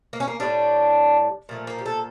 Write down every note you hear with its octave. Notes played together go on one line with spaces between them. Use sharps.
A#3
C#4
A#3
A2 G3 D4
A#2 F3 A3
A#3
G4
A4